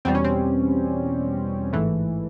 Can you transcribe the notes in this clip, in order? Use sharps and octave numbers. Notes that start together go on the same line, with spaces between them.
E2 B2 G3 C4
C#4
C4
A1 G#2 E3 A3